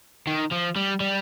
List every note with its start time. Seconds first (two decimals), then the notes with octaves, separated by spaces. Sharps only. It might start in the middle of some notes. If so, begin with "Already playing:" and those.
0.27 D#3
0.52 F3
0.76 G3
1.00 G3